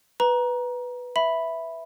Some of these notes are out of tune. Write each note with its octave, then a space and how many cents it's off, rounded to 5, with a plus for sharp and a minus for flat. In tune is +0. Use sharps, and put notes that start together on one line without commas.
B4 +0 A#5 +20
E5 +0 B5 +0